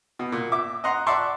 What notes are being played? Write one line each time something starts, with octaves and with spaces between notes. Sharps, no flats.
B2
A#2
E5 D6
D#5 F#5 A#5 C6
D5 E5 F#5 A5 C6 C#6